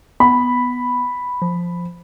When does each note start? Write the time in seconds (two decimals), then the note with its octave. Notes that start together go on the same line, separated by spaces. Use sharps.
0.20 B3 B5
1.42 F3